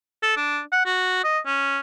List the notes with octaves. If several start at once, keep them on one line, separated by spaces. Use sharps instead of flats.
A4
D4
F#5
F#4
D#5
C#4